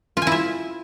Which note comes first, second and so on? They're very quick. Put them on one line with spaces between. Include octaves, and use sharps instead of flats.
F4 G#5 E4 E5